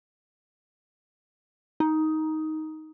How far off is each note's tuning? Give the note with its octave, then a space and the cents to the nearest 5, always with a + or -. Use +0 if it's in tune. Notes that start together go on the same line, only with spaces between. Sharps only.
D#4 +10